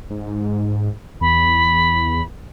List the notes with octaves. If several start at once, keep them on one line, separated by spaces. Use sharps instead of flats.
G#2
E2 B5